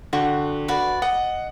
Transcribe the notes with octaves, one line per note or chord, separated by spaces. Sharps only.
D3 F#4 G5 C#6
F#4 B4 D5
D#5 F#5